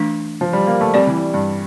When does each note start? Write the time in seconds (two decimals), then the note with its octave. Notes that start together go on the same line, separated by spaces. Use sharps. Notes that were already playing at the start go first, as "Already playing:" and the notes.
Already playing: E3 A3 D4
0.41 F3
0.53 G3
0.67 A#3
0.81 A3
0.94 G3 C4 G4 D5
1.07 E3
1.34 G2